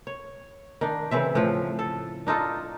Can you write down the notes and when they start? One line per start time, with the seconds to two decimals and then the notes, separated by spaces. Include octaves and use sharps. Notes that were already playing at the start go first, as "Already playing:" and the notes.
0.07 C#5
0.81 D#3 D4
1.11 C#3 E3 C4 E5
1.35 A2 F3
1.79 A4
2.27 D4 D#4 F4 A4